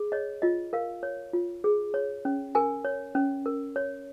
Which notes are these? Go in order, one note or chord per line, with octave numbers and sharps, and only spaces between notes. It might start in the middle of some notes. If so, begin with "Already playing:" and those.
Already playing: G#4
C#5 D#5
F4 D#5
A#4 F5
C#5
F4
G#4
C#5
C#4
A#4 G#5
C#5
C#4
A#4
C#5